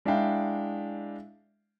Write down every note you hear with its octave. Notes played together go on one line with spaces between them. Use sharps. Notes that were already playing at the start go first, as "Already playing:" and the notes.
G#3 D4 E4 E5 F5 G5